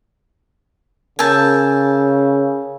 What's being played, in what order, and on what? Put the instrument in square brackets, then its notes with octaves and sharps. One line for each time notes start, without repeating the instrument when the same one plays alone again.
[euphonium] C#3 [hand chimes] A#4 E6 G6 [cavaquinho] G#5 A5